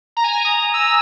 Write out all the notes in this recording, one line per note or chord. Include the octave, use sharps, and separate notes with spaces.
A#5
G#5
A#5
D#6
E6